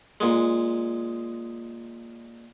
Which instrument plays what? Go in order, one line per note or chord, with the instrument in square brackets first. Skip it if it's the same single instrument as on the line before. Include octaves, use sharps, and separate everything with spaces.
[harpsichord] A#2 G#3